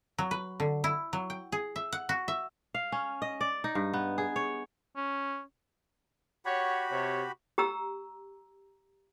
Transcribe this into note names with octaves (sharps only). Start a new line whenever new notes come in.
F#3
B4
D3
E4
F#3
G5
G#4
E5
F#5
F#4
E5
F5
C#4
D#5
D5
D#4
G2
B3
G#4
C#5
C#4
F#4 G4 C#5 F#5 B5
C3 C#5
G4 A#5 E6